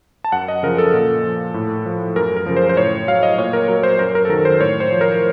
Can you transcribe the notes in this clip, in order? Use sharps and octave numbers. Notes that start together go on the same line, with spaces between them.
A5
F#2 F#5
D#5
C#3 F3 A#4
A4
A#2
F3
A2
F3
F#2 A#4
A#4
C#3 F3
C5
C5
A2 C#5
F#3 F5
D#5
A#2 C#5
A#4
F#3 A#4
C5
F#2 A#4
A#4
A4
D#3 F#3 A#4
C5
A2 C#5
C5
F3
A#4